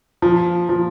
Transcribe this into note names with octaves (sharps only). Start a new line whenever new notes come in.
F3
F3